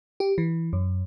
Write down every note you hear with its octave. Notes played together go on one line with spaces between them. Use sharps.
G4
E3
F#2